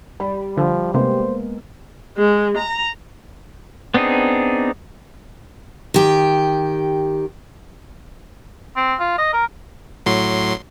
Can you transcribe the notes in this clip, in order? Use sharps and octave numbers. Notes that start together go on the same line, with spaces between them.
G3 B5
D3 F3
C3 G#3 A#3 B3 C5
G#3
A#5
B3 C4 D4 D#4 G#4
D#3 G4
C4
F4
D#5
A#4
A2 F#3 C6